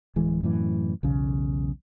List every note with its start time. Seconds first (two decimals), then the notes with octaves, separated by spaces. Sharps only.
0.16 D1 E3 G#3
0.43 F#2 A2 E3
1.03 B1 E2 C#3